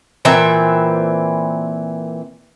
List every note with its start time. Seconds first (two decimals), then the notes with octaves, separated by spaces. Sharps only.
0.25 A#2 E3 C4 E5